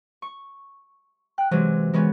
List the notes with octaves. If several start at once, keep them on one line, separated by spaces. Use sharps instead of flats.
C#6
G5 F#6
C3 E3 F#3 G#3
E3 G#3 B3 C#4